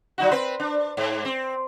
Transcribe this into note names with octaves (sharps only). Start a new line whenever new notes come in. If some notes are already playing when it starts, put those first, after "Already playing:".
F#3 D#4 F#4
C4 B4
D4
G#2
C4